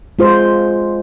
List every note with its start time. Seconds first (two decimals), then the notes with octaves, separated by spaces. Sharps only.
0.19 G#3 F4 C5